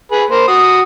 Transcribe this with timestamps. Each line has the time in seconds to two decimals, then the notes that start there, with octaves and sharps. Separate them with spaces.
0.12 G#4 B4
0.31 A#3 C5
0.48 F#4 D#6